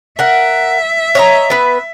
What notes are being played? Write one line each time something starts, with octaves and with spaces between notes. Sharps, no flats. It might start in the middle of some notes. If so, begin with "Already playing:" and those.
A#4 E5 F#5
C#5 D#5 A#5
B3 B4